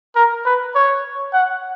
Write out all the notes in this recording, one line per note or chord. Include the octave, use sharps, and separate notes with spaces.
A#4
B4
C#5
F#5